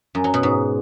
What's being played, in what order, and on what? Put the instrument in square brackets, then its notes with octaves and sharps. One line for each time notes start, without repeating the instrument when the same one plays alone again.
[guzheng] F#2
F#3
B2
G#2